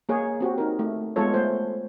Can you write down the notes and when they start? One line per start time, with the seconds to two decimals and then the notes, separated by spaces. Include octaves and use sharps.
0.09 A#3 G#4 C#5
0.41 C4 F#4 G4
0.58 D#4 A#4
0.79 A3
1.16 G#3 B3 F4 A4 C#5
1.34 A3 C5